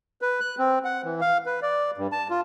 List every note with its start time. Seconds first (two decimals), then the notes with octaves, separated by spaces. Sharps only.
0.22 B4
0.40 F#6
0.59 C4
0.85 F#5
1.04 E3
1.21 F5
1.46 B4
1.62 D5
1.98 G2
2.12 A5
2.30 F4